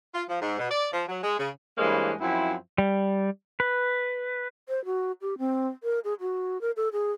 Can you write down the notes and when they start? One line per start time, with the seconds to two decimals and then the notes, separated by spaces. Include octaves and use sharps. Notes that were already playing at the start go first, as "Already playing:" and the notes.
0.15 F4
0.29 F3
0.41 G#2
0.59 B2
0.71 D5
0.93 F3
1.08 F#3
1.23 G#3
1.39 C#3
1.78 G2 E3 G#3 A#3 C5 C#5
2.20 F#2 F3 C4 E4
2.78 G3
3.60 B4
4.69 C5
4.85 F#4
5.21 G4
5.38 C4
5.83 A#4
6.04 G#4
6.20 F#4
6.61 A#4
6.77 A4
6.93 G#4